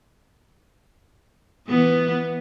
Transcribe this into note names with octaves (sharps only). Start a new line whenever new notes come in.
E3 B3